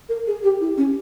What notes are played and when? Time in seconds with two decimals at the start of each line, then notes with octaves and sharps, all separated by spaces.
0.09 A#4
0.27 G#4
0.42 G4
0.60 E4
0.77 C#4